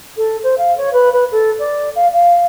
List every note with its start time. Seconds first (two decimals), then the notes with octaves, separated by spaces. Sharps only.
0.17 A4
0.43 C5
0.58 F5
0.77 C#5
0.93 B4
1.12 B4
1.31 A4
1.59 D5
1.95 F5
2.13 F5